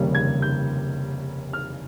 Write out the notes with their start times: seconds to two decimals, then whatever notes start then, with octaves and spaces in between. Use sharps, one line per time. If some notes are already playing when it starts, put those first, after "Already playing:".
Already playing: F1 D#2 C#3 G3 A#3
0.15 G#6
0.42 G6
1.53 F6